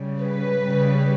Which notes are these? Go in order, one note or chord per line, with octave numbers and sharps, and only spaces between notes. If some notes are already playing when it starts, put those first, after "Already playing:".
Already playing: C#3 G3
B4
C#3 G3